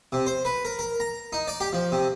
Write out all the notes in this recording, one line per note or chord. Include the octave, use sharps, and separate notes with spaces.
C3
C5
B4
A#4
A#4
A#5
D#4
D5
G4
F3
C3